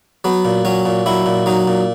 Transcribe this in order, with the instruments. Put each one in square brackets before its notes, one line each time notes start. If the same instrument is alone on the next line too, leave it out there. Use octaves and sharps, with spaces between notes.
[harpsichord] F#3 B3
A#2
F#3 C#4
A#2
F#3 E4
A#2
F#3 D#4
A#2